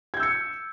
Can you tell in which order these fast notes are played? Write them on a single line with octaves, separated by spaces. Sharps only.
G#6 G6 E6 C#7